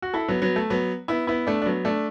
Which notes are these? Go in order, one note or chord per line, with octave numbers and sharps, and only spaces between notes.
F#4
E4 A4
F#3 B3
F#3 B3
A3
F#3 B3
B3 E4
B3 E4
A3 D4
D4
F#3 B3
A3 D4